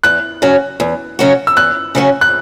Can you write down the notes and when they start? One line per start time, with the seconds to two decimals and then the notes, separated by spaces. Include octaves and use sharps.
0.04 E2 F#6
0.42 C#3 F#3 C#4 F#4
0.80 E2
1.19 C#3 F#3 C#4 F#4
1.47 E6
1.57 E2 F#6
1.95 C#3 F#3 C#4 F#4
2.21 F#6